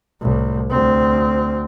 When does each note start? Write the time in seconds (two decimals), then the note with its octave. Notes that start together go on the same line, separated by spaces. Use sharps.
0.21 C2 A2
0.70 D2 C4